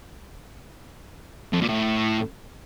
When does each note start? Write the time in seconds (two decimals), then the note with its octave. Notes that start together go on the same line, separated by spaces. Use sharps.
1.53 F2
1.61 A#2
1.69 A2